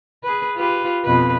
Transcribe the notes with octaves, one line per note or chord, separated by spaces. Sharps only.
G#4 B4
F4 G4 B4
F2 B2 B4